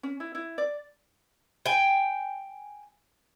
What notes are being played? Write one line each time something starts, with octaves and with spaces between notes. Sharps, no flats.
C#4
E4
E4
D5
G5 G#5